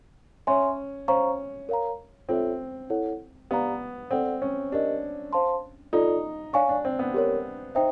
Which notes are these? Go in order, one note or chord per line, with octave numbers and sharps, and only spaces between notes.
C#4 C#5 E5 G#5 C6
C#4 C5 F5 A#5 C#6
A#4 C#5 F5 A#5
C4 F4 A4 C#5 E5
E4 A4 C#5 F#5
B3 G4 B4 D5 F5 A#5
C4 A4 D5 F#5
C#4
D4 G4 A#4 D#5
C5 F5 A5 C6
D#4 F4 A4 D5
D4 C#5 F5 G#5 C#6
D4
C4
B3
G4 A#4 C#5
D#4 C5 E5 G5